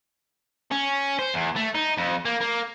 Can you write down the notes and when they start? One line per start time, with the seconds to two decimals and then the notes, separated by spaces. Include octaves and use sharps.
0.71 C#4
1.19 C5
1.34 E2
1.56 A3
1.75 D#4
1.97 F2
2.25 A#3
2.41 A#3